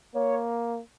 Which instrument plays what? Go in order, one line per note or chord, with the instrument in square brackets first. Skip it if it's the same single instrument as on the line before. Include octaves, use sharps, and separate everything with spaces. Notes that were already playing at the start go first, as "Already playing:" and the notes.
[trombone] A#3 [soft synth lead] C#5